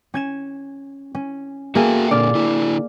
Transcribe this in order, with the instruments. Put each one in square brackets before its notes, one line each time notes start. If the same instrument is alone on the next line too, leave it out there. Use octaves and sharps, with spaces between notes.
[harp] C#4 G#6 E7
C#4
[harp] A#3 G#4 A4 [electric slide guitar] F#4 E5 G5
[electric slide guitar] A#2 D3 [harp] D5 F6
[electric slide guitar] D3 E4